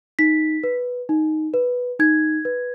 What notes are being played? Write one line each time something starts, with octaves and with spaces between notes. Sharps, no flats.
D#4 B6
B4
D#4
B4
D#4 G#6
B4